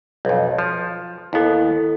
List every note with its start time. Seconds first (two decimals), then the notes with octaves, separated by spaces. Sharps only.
0.25 B1 F2
0.59 F3
1.33 D#2 B3 E4 A4